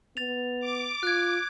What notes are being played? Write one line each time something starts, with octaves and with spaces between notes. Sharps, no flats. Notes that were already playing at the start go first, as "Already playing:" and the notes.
B3 A6 F7
D6
F4 F#6 G#6